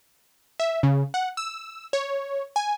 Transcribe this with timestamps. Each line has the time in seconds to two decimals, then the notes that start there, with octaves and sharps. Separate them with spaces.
0.60 E5
0.83 C#3
1.14 F#5
1.37 E6
1.93 C#5
2.56 G#5